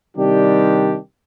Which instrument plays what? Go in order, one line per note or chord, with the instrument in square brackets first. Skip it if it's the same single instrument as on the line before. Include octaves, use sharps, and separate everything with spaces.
[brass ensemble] C3 D#3 G3 D4 G4